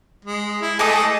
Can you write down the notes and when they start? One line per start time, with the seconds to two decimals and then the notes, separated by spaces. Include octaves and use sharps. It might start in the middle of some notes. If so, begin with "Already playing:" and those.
0.25 G#3
0.61 E4
0.79 A3 G#4 A4 D#5 D6 D#6